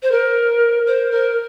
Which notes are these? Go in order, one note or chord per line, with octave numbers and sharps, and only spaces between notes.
C5
A#4
C5
A#4